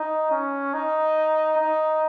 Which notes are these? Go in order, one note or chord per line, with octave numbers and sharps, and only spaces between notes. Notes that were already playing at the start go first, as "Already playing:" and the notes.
Already playing: D#4
C#4
D#4
D#4